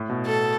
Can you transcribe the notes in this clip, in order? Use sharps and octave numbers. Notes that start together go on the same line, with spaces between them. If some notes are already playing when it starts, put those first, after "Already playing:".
Already playing: A2
B2
A4